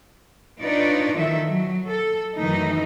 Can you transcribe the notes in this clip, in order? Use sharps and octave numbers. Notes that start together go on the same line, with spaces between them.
D4 D#4 F4 B4 C#5 D5
D#3 E3 A4 E5
F#3
A4
F#2 D#3 E3 A3 D#4